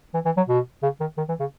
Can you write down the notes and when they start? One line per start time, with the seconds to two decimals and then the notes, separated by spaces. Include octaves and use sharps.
0.14 E3
0.25 E3
0.37 F#3
0.49 B2
0.83 C#3
1.00 D#3
1.18 D#3
1.29 E3
1.40 C#3